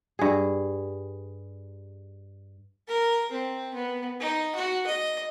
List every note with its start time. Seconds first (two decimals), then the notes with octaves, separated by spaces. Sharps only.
0.19 G2 G#4
2.88 A#4
3.31 C4
3.74 B3
4.20 D#4
4.55 F#4
4.86 D#5